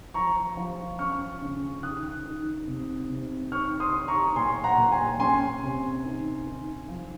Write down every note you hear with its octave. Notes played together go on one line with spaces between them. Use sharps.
F3 A#5 C#6
F3
C#4 C#6 F6
C#3
D#3 D#6 F#6
D#3
C3
C3
D#3 C#6 F6
C6 D#6
D#3
A#5 C#6
A#2 G#5 C6
F#5 A#5
A#2
G#5 C6
C#4 G#5 C6
C3
D#3
D#3
F3